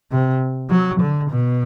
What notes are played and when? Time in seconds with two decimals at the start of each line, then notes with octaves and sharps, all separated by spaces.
0.11 C3
0.70 F#3
1.00 D3
1.30 B2